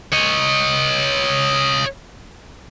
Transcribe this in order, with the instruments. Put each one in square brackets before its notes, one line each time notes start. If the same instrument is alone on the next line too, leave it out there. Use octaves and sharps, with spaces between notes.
[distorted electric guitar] C#5 D#5